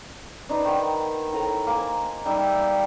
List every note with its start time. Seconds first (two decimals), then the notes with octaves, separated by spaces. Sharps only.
0.49 D4 D#4 B4 C5
0.65 D#3 F#5
1.33 A2 A#5
1.67 A#3 C5 G#5
2.25 G3 D#4 E5